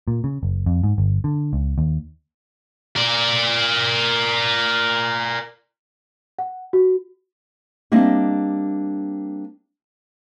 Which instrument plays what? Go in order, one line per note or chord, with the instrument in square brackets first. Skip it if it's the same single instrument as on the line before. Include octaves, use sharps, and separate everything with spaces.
[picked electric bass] A#2
C#3
F#1
F2
G#2
G1
D3
C#2
D#2
[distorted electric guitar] A#4 D5
[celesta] F#5
F#4
[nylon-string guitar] G3 A#3 C4 D4 D#5 E5